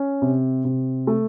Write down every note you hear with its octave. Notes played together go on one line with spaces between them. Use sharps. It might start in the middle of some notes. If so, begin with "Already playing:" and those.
Already playing: C#4
C3
C3
A3